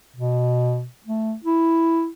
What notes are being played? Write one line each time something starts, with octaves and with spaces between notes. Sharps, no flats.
B2
A3
E4